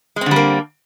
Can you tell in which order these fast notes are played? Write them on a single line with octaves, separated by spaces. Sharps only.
G#3 C4 D3 G3 A#3